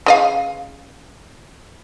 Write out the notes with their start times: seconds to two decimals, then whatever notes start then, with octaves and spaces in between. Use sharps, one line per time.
0.06 C#3 D#5 F5